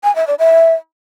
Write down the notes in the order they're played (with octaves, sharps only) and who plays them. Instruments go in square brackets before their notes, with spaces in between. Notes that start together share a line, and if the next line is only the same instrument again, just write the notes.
[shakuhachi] G#5
E5
D5
E5